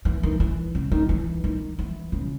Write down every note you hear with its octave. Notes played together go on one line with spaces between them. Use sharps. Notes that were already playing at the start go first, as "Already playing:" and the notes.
E3
D#3
E3
C#3
D#3
E3
D#3
E3
C#3